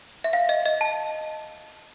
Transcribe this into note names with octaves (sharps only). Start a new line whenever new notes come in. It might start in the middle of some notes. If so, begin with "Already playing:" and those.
E5
F5
D#5
D#5
A5